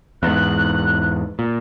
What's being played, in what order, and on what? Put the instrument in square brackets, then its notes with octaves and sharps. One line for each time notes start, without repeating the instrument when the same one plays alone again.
[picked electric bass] E2 G#2 [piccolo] F#6
[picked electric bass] A#2